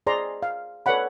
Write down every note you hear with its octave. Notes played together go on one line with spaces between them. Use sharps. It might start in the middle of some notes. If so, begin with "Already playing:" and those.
G#4 C5 D5 D#5 A#5 C6
F5
A4 B4 C#5 D5 F#5 B5